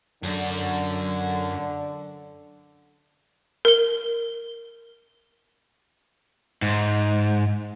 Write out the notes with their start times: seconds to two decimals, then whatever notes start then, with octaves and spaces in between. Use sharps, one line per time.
0.23 F#2 D3
3.65 A#4 G7
6.62 G#2